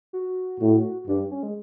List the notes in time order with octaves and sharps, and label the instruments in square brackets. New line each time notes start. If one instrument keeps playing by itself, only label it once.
[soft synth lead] F#4
[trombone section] A2
[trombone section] G2 [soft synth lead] D4
[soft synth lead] C#4
G#3